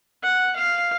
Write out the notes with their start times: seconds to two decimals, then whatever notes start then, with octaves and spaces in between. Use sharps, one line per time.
0.23 F#5
0.56 F5